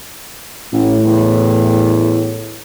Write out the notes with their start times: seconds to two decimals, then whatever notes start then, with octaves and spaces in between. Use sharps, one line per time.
0.73 A1 A2
1.05 E2